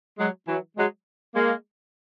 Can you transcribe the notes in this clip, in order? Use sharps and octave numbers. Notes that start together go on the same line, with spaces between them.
F#3 G#3
E3 F#3
F#3 G#3
G#3 A#3